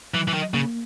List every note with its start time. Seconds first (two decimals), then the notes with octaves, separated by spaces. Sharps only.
0.14 E3 F#3
0.28 E3
0.34 D#3
0.54 C#3 A#3